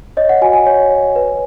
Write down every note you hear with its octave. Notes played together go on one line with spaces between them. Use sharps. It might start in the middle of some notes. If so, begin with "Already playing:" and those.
C#5 D#5
F#5
F#4 G#5
G#5
C#5
C#5
B4